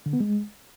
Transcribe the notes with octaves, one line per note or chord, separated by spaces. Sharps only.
D3
B3
G#3